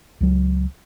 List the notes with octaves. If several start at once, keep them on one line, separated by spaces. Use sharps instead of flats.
C#2 F#3